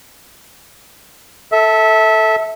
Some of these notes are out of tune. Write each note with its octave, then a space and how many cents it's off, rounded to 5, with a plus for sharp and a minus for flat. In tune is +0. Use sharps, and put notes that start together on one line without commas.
A4 +0 E5 -20